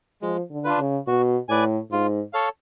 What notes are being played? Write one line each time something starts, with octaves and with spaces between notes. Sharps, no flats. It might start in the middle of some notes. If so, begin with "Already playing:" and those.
F3 G#3
D3
D4 F4 B4
C#3
B2 F#4
A2 B4 D5 G#5
G#2 F4
A4 C#5 F5